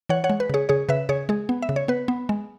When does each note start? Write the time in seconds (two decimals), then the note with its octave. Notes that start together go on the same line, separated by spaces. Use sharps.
0.09 E3 C#5 F#5
0.24 C#5 F#5
0.30 G#3
0.40 B4
0.50 C#3 G#4 C#5
0.69 C#3 G#4 C#5
0.89 C#3 B4 E5
1.09 C#3 G#4 C#5
1.29 G#3 G#4
1.49 B3
1.62 E5
1.69 C#3
1.76 C#5
1.88 B3 B4
2.08 B3
2.29 G#3